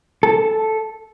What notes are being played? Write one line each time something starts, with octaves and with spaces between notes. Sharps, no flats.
A4